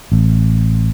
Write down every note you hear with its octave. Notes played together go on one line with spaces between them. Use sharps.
A1